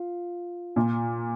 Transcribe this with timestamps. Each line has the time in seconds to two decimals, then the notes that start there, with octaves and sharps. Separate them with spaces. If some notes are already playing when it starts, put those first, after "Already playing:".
Already playing: F4 F5
0.76 A#2